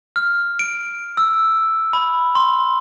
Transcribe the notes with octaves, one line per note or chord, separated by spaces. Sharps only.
F6
D7
E6
B5
C6